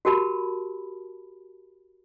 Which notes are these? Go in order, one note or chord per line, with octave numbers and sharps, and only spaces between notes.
F#4 G4 A#4 A5 B5